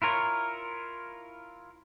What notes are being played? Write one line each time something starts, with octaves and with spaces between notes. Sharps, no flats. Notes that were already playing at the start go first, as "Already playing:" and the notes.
E4 F4 A#4 C#5